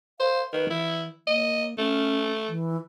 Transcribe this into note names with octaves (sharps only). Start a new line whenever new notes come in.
C5 F5
D#3 B4
E3 E4
A#3 D#5
A3 C#4
E3